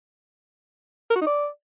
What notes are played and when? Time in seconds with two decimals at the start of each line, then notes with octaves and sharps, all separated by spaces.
1.10 A#4
1.16 F#4
1.21 D#4
1.27 D5